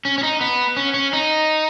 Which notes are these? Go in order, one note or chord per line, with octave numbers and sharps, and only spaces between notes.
C#4
C#4
D#4
B3
C#4
C#4
D#4